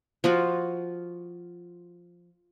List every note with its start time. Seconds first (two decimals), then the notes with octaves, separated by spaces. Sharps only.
0.24 F3 F4 F#4